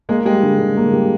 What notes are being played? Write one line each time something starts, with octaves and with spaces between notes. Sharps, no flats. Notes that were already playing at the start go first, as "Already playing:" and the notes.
G#3 A#3
G3 G#3
D3
D3
A#3
G3